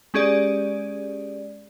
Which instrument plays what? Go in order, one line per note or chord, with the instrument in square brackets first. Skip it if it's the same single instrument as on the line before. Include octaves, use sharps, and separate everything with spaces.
[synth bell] G#3 C#4 G4 G#4 D5